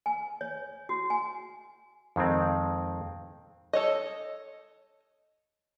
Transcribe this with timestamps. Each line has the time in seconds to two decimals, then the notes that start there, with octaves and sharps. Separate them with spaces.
0.06 G#5
0.41 C#5
0.89 F#4
1.10 G#5
2.16 F2 D#3 G#3 C4
3.73 A4 C#5 D#5